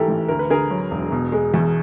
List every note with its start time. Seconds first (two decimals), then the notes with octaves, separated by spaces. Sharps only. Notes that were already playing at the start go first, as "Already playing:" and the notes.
Already playing: G#2 E3 A3 G4 A4 A#4
0.08 A1
0.29 D2 A#4
0.39 B4
0.50 D3 G#4 A#4
0.71 F#3
0.91 E1
1.12 B2
1.32 G#3
1.54 E2